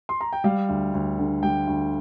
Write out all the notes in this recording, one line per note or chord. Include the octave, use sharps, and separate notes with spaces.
C6
A#5
G5
G3 F5
D2
D2
D3
G3 G5
D2